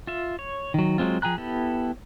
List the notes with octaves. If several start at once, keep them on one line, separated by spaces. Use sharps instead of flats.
F4 E5
C#5
D#3 F#3
F#3 G#3 C4 F4
F3 G#4 G5 A#5 F#6
B3 E4 G4 A4